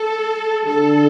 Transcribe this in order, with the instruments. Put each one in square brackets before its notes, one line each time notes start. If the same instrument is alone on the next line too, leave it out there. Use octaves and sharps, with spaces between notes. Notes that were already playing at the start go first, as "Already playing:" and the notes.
Already playing: [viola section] A4
[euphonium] D3 [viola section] A4